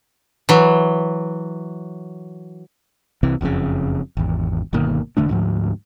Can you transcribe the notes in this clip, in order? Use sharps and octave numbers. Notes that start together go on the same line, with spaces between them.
E3 F#3
C2 C3 E3 C4
F#1 F2 A2 C#3
G#1 E2
G1 B2 D#3 A#3
E1 D3 A3 D4
D2 G#2 F3